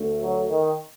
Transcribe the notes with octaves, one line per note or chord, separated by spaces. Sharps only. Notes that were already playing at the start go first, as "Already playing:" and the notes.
Already playing: D2 D3 A3
F#3
D#3